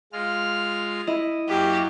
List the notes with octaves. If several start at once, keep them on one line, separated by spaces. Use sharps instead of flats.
G#3 F4 F6
E4 D#5
F#2 F#3 A#3 G4